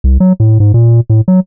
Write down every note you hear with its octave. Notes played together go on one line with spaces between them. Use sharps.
C2
F#3
A2
G#2
A#2
A2
F#3